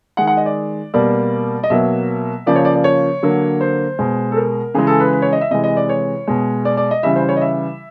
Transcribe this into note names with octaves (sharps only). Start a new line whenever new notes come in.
D#3 G#3 F#5
F#5
D#5
D5
B2 G3 A#3 D5
D#5
B2 F#3 A#3 E5
C#3 F3 A#3 D5
C#5
D5
D5
C#5
D3 F#3 A#3
C5
B2 G#3
A4
A#4
C#3 E3 G#3 G#4
A4
B4
B4
C#5
D#5
E5
C3 E3 G#3 D#5
D#5
D5
C#5
B2 G#3
D5
D5
D#5
C#3 E3 G3 E5
C5
C#5
D#5
E5